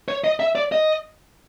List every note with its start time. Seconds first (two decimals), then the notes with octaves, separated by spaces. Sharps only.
0.08 C#5
0.24 D#5
0.40 E5
0.55 D5
0.72 D#5